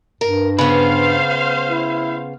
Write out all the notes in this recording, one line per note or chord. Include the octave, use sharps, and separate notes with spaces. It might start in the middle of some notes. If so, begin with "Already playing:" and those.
G2 A#4
C#3 B3 B4 C5 F5
E4